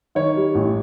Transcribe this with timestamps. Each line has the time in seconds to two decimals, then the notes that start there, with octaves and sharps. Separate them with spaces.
0.15 D#3 C#5
0.36 G3
0.55 A1